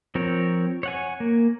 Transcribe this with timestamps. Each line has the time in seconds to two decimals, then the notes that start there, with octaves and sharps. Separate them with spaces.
0.15 F3 C4 A#4 C#5
0.83 C#5 F#5 G#5
1.20 A#3